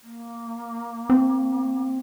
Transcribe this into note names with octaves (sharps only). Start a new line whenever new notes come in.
A#3
C4